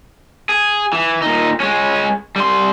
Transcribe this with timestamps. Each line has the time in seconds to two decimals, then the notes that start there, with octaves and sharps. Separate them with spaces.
0.49 G#4
0.93 E3
1.22 A#2 D#4
1.60 G#3 C#4
2.36 G3 C6